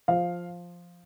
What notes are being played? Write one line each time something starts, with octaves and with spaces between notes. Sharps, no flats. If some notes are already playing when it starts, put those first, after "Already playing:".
F3 F5